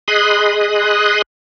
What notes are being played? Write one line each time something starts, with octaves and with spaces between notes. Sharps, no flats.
G#4 D#5 B5 C6 D#6 F#6